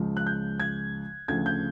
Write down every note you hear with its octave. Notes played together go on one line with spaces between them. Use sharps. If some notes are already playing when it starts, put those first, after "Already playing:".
Already playing: C#2 C#3 F3
F#6
G6
G#6
D2 C#3 F3 G#6
G6